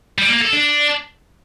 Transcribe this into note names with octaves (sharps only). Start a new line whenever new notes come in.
G3
A#3
A4
D4